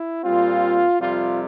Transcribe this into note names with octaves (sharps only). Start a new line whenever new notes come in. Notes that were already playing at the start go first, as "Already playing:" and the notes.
Already playing: E4
A#2 G3 C4 F4
F2 C3 G3 F4